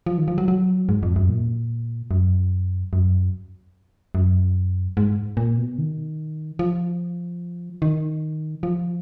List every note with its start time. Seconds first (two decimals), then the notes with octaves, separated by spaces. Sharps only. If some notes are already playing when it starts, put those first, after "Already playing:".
0.06 F3
0.18 D#3
0.28 F3
0.38 F#3
0.48 F#3
0.89 G#2
1.03 F2
1.16 F#2
1.29 A#2
2.11 F#2
2.93 F#2
4.15 F#2
4.97 G#2
5.37 A#2
5.58 B2
5.78 D#3
6.59 F3
7.82 D#3
8.63 F3